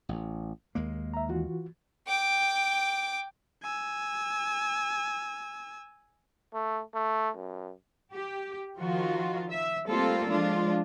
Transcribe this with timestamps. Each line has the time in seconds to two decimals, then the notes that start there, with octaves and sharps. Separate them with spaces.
0.09 A1
0.75 D#2 G#3 A#3
1.14 E5 A#5
1.29 E3 F4 F#4
2.08 G5 D6
3.63 G#5 E6
6.54 A3
6.95 A3
7.35 F#2
8.12 G4
8.79 D#3 F3 F4 F#4
9.50 E5
9.87 G3 A3 A#3 C4 F4 A4
10.29 F3 G#3 D4 F4